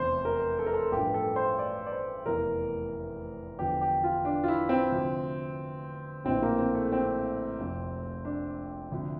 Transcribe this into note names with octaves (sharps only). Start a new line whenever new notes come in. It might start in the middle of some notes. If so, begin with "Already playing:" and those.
Already playing: F1 E2 C3 C5
A#4
A4
A#4
A4
A1 G2 F3 G4
A4
C5
D5
D5
C5
F1 E2 E3 A#4
E2 D3 F3 G4
G4
F4
D4
F4
E4
C4
D2 C3 F3
A#1 A2 E3 C4
A#3
C4
A3
C4
F1 F2 C3
D4
D2 C3 F3